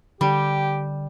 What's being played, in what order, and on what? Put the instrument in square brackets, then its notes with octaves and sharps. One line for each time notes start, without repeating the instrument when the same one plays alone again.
[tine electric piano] D3 [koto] G3 [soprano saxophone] G4